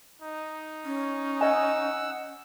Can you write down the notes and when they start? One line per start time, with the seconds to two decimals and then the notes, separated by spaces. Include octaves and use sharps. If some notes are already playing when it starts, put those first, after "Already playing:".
0.22 D#4
0.85 C#4
1.41 D#5 F#5 G#5 E6